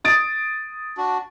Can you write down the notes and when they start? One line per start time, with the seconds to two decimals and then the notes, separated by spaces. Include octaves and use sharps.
0.04 D#6 A6 D7
0.97 D4 F#4